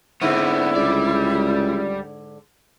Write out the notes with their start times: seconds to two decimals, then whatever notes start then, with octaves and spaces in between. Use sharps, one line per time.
0.21 G#2 D3 B3 C4 E4
0.75 C#2 G3 D5